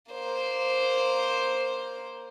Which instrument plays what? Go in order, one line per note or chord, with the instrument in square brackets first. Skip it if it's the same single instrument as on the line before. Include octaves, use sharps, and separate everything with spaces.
[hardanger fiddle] A#3 C5